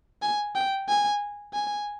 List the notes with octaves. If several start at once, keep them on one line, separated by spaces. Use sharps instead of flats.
G#5
G5
G#5
G#5